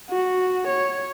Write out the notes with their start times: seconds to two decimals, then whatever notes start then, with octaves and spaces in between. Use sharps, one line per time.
0.10 F#4
0.67 C#5